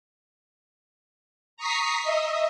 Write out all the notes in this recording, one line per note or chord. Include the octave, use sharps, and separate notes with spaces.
A#5 C#6 D#6 B6 C7
D#5 E5